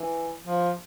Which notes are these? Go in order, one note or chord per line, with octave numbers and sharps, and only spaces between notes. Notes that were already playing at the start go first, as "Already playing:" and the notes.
Already playing: E3
F3